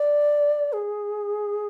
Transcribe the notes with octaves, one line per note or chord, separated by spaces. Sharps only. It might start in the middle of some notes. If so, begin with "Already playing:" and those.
Already playing: D5
G#4